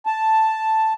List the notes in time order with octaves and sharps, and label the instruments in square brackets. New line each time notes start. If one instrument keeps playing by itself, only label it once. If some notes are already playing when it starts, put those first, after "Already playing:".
[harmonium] A5